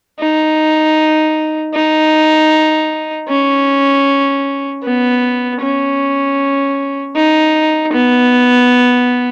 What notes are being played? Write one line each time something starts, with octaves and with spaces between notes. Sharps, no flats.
D#4
D#4
C#4
B3
C#4
D#4
B3